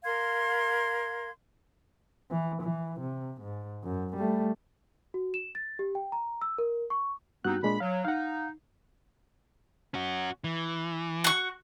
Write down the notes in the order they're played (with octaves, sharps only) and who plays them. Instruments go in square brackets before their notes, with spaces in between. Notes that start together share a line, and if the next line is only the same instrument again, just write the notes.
[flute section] A#4 F5 C6 G#6
[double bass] E3
E3
C3
G#2
F#2
G3 A3
[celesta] F#4
E7
A6
G4
G5
A#5
E6
A#4
C#6
[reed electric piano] G2 F#4 F#6 [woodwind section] B3 C4 D#4
[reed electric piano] A#2 G#3 D4 [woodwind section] B5
[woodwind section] F#3 [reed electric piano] F5
[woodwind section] D#4 [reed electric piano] F5 F#5
[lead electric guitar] C#4 F#4
E3
[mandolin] F#4 C#6